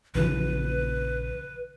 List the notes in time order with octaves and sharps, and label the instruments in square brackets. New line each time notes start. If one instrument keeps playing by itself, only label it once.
[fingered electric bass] A#1 C#3 E3 [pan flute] B4